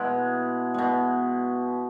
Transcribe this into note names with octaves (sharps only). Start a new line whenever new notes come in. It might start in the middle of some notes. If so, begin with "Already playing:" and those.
Already playing: B2 G#3 E4
B2 G#3